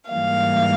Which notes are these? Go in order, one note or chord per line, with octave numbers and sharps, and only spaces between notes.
G#2 E3 G3 A#3 F5